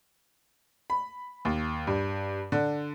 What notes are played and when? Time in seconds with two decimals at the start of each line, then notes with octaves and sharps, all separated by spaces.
0.90 B5
1.45 D#2
1.87 G2
2.52 D3